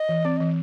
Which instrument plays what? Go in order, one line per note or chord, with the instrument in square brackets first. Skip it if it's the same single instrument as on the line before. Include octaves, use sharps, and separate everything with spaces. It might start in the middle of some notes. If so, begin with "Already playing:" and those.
Already playing: [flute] D#5
[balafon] E3
[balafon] C4 [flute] D5
[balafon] E3 [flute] D#5